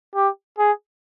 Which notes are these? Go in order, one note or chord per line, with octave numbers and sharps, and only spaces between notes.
G4
G#4